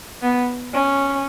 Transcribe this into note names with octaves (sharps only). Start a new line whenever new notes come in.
B3
C#4